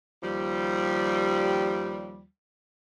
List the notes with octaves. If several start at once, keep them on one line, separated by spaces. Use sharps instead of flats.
D#2 F3 G3